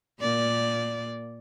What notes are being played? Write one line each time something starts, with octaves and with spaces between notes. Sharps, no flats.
A#2 A#3 D5